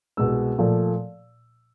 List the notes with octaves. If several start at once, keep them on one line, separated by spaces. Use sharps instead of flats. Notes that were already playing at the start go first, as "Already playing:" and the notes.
C2 B2 G#3 E6
A#2 F3 A3